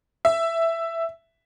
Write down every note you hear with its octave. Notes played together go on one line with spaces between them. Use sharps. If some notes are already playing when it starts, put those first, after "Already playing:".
E5